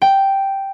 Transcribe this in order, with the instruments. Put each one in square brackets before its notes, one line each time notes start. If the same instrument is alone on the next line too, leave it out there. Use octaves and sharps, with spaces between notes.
[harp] G5